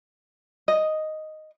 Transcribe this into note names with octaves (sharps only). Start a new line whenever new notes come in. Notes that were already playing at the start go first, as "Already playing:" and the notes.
D#5